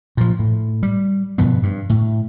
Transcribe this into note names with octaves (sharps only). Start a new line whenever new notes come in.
A#2 F3
A2
G3
G2 B2 F3 B3
G2
A2